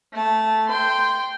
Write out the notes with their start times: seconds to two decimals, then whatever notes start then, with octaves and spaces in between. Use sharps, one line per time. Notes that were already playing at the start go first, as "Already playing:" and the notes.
0.13 A3 A5
0.69 G5 C6